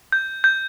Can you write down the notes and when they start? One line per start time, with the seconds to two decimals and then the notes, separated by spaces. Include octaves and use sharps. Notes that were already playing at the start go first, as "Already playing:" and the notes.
0.12 G6
0.44 G6